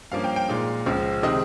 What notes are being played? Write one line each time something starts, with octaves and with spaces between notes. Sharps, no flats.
G2 F3 A#3 C#4 F5
G5
G5
A#2 G#3 D#4 F5
C#2 C#3 F3
C3 D#3 G#3 C4 D#5